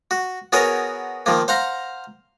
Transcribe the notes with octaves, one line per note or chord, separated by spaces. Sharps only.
F#4
B3 F#4 G#4 A#4 C#5
D#3 F3 A#3
C5 F5 F#5 A#5